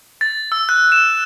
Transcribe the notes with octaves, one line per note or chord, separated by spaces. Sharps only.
A6
E6
F#6
E7